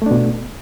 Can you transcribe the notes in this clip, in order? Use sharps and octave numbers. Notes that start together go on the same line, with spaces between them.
B2 A3 D4